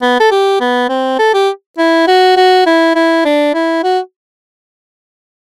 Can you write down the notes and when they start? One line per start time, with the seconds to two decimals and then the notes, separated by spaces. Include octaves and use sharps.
0.02 B3
0.20 A4
0.31 G4
0.61 B3
0.89 C4
1.19 A4
1.34 G4
1.78 E4
2.08 F#4
2.37 F#4
2.66 E4
2.96 E4
3.25 D4
3.54 E4
3.84 F#4